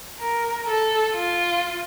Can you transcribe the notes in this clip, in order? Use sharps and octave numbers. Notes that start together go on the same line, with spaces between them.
A#4
A4
F4